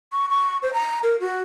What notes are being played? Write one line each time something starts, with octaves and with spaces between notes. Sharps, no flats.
C#6
C#6
C5
A#5
A#4
F#4